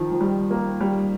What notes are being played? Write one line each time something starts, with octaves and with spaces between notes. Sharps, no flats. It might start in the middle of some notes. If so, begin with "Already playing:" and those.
Already playing: D#3 F3
F3
G3
A#3
G3